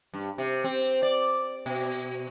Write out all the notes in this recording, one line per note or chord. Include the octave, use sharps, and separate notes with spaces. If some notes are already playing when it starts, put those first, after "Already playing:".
G2
C3
C4
D5
B2